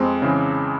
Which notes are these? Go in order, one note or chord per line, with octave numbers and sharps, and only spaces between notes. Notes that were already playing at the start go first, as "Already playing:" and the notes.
Already playing: F2 G#3 C4
C#3 E3